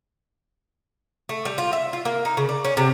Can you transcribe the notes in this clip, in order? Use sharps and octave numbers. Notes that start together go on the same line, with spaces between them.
A3
G3
F4
E5
F4
A#3
D#4
C#3
D5
C#4
C3